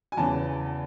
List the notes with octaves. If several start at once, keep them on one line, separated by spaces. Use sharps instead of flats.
G#5
E2 C#3 E3 A5